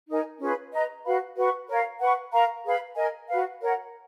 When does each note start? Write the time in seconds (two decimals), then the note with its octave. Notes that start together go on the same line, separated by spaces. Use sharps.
0.08 D#4 A#4 D#5 G#5
0.40 C#4 F4 G#4 B4
0.72 B4 D#5 A#5
1.04 F#4 B4 F5 B5
1.36 F#4 B4 F#5 C#6
1.68 A#4 C#5 F5
2.00 B4 F#5 C#6
2.32 A#4 F5 A#5 C#6
2.64 G#4 B4 F5 B5
2.96 A#4 D#5 G#5
3.28 F#4 B4 F5
3.60 A#4 C#5 F#5